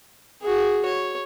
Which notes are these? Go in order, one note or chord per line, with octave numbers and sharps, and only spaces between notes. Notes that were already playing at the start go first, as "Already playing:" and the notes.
F#4 G#4
C#5